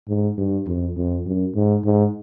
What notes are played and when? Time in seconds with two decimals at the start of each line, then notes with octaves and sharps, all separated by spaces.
0.08 G#2
0.38 G2
0.67 F2
0.96 F2
1.26 F#2
1.55 G#2
1.84 G#2